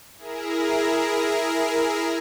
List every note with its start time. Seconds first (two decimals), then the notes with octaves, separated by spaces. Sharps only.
0.17 E4 G#4 A#4